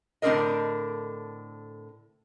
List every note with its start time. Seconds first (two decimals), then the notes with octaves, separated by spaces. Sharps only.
0.22 A2 D3 C4 D4 A#4 D#5